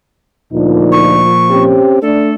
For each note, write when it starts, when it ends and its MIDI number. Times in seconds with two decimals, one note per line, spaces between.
0.53 1.24 38
0.53 1.83 46
0.53 1.83 53
0.53 1.24 62
0.53 1.24 63
0.92 1.63 85
1.50 2.01 60
1.50 2.01 61
1.50 2.01 67
2.01 2.34 57
2.01 2.34 62
2.01 2.34 69